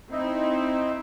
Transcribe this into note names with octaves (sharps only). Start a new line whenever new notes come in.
C4 D#4 E4